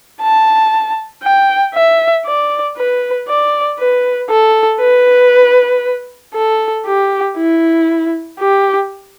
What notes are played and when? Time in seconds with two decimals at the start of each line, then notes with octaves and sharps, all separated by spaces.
0.21 A5
1.23 G5
1.75 E5
2.26 D5
2.77 B4
3.28 D5
3.79 B4
4.30 A4
4.81 B4
6.35 A4
6.86 G4
7.37 E4
8.40 G4